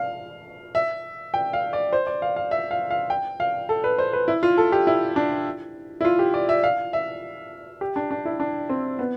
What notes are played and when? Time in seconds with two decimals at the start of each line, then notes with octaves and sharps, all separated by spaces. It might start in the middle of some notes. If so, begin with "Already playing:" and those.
Already playing: F5
0.75 E5
1.34 G5
1.53 F5
1.73 D5
1.93 C5
2.07 D5
2.22 F5
2.36 F5
2.51 E5
2.71 F5
2.91 F5
3.10 G5
3.40 F5
3.69 A4
3.84 B4
3.98 C5
4.13 B4
4.28 E4
4.43 F4
4.58 A4
4.72 G4
4.87 E4
5.16 D4
6.01 E4
6.05 F4
6.19 G4
6.34 D5
6.49 E5
6.63 F5
6.93 E5
7.81 G4
7.96 D4
8.11 D4
8.25 E4
8.40 D4
8.69 C4
8.99 B3